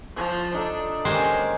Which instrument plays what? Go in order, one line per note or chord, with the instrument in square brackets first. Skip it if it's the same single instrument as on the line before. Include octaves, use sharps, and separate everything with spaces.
[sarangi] F3 [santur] C#6
[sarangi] D4 [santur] D#4 A4
[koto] D#3 G#3 C5 [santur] A#3 C#4 G4